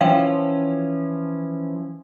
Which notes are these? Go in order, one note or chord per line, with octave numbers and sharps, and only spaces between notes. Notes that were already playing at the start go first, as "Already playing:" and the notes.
E3 F3 C#4 F5 G5